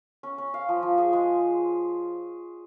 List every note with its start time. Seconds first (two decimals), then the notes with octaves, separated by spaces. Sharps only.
0.23 C#4
0.38 C#4
0.54 F5
0.69 F3
0.83 F3
0.98 G#4
1.13 G#3